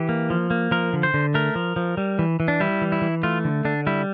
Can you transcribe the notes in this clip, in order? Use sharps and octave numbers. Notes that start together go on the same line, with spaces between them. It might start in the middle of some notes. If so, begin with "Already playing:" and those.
Already playing: E3 G4
A#3
F3
A#3
F3 A#4
D3
C5
D3
A3 A#4
F3
F3
G3
E3
E3
D4
G3 E4
E3
E4
E3
A3 F4
D3
D3 D4
G3 E4